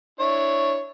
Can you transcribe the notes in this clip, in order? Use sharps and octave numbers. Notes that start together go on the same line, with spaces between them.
D4 E4 C#5